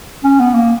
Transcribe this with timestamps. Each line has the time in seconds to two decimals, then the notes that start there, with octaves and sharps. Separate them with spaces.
0.24 C#4
0.40 B3
0.55 A#3